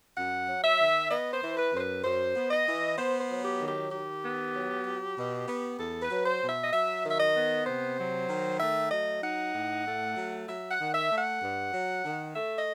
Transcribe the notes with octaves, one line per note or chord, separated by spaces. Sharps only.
F#2 F#5
F#3
E5
D#3
B3 D#5
C5
E3
B4
F#2 C5
B4
F#2 C5
B3
D#5
E3
B3 C5
C5
F#3
G4
D#3
G4
D#3 G4
B3
F#3
F#3
B2
B3
E2 A4
B4
F#3
C5
B2
E5
D#5
F#3 E5
D#3
E5
D#5
B3
C3 C5
F#3
D#3
A3 E5
F#3 D#5
D#4 F#5
A2
A3
F#3
F#3 E5
F#5
D#3
E5
A3
F#5
G2
F#3
D#3
A3 E5
D#5